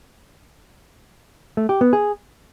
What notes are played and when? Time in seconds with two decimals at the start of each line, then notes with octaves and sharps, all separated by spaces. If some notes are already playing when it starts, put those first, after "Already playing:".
1.57 A3
1.69 G4
1.81 B3
1.93 G#4